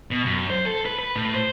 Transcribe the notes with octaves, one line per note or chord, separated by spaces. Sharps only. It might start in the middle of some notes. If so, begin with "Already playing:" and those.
B2
F#2
C5
A4
B4
B4
A2
C5